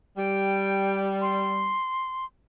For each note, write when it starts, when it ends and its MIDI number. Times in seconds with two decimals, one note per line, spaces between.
0.17 1.76 55
0.17 1.01 79
1.21 2.25 84